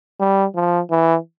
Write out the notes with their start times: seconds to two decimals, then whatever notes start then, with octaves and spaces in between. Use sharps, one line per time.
0.20 G3
0.55 F3
0.91 E3